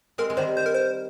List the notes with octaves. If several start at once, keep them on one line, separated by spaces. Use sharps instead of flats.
G#3 C4 A#4
G#3
D#3 G3 C5
C5
A#4
C5